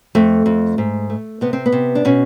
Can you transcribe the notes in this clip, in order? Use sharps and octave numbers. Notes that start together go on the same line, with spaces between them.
F2 A3
F2
G#2
A3
C3 B3
C4
B3
C3
D4
B2 C#4